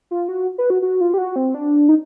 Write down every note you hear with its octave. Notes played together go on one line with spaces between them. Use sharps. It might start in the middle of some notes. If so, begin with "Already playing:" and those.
F4
F#4
B4
F#4
F#4
F4
G4
F#4
C4
D4
D#4